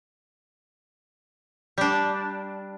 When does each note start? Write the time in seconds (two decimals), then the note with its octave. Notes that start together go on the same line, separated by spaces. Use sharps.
1.78 G3 D4